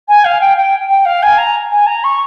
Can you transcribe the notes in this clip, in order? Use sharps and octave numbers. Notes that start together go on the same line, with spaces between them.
G#5
F5
G5
G5
G5
F5
G#5
A#5
G#5
A#5
C#6